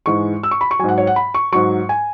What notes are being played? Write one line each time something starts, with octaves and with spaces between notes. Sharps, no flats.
G#2 E3 G#3 C#6
E6
C#6
B5
C#6
G#2 F#3 F#5 G#5
C#5
F#5
B5
C#6
G#2 F#3 C#6
G#5